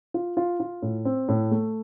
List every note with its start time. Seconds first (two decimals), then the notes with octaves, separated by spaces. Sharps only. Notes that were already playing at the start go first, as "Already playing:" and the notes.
0.14 F4
0.37 F4
0.60 F4
0.82 A2
1.05 C4
1.28 A2
1.51 A3